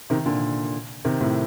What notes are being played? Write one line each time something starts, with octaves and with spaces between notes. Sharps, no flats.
C3 D#3
A#2 D3
C3 D#3
A2 C3